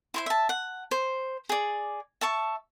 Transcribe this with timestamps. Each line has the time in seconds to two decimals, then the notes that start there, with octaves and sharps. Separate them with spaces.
0.14 E4 C5 C6
0.26 E5 A5
0.49 F#5
0.91 C5
1.49 G#4 D5
2.21 E5 A5 C#6